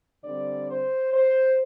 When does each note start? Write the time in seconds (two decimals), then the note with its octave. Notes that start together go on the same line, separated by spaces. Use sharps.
0.24 D3 G3 C4 D5
0.68 C5
1.12 C5